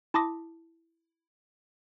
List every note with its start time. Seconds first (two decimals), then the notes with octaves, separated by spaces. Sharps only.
0.14 E4 A5 C6 D6 D#6 A#6